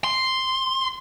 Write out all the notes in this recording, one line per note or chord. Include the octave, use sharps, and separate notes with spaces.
C6